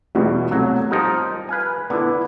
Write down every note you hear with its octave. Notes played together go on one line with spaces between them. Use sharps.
E2 B2 G3
C2 F#3 A3
F3 G3 D#4 A#4
B4 F5 G#5
D3 B3 E4